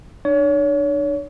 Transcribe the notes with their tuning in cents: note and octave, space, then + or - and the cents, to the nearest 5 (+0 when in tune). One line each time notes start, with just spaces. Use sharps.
D4 +40 C#5 +30